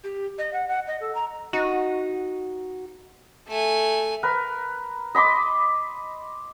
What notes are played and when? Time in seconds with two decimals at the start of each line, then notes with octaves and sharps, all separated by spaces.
0.04 G4
0.38 D#5
0.53 F#5
0.68 F#5
0.87 D#5
1.01 A4
1.15 A#5
1.53 D#4 F#4
3.48 A3 G#5
4.23 A#4 B4
5.15 D#5 B5 C6 D6